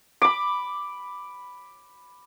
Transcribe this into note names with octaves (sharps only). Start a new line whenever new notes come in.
B5 D6